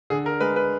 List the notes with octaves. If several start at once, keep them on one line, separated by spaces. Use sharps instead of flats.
D3 G#4
A#4
G#3 B4
B4